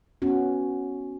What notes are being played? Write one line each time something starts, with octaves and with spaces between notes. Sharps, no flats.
B3 C#4 F#4